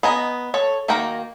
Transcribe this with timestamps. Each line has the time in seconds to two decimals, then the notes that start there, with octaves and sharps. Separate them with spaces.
0.03 B3 D#5 G#5 A#5
0.54 A4 C#5
0.88 D#3 A#3 F#4 G5 A#5